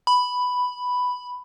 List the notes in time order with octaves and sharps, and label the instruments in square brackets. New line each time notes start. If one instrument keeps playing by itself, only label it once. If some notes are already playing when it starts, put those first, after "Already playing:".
[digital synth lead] B5